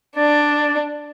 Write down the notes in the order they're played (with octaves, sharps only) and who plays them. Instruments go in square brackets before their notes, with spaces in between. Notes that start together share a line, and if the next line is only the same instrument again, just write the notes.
[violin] D4 [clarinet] D5